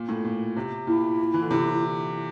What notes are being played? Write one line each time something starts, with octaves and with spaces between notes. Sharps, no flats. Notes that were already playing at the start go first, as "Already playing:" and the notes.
Already playing: A#2
A2
A#2
C3
A#2 E4
E3
D3
C3